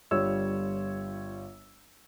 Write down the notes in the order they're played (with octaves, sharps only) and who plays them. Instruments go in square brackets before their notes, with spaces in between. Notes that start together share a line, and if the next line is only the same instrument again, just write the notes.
[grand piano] G1 G3 F4 C#5 E6